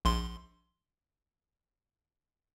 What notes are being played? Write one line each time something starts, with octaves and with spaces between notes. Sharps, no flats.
A#1 C6